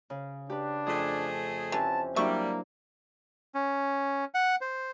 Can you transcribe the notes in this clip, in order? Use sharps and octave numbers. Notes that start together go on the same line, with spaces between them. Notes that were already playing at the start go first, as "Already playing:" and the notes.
C#3
D4 G4 B4
F2 A3 G#4
E3 C4 C#4 G4 A5
F#3 G3 A#3 D4 E4 E5 C#6
C#4
F#5
C5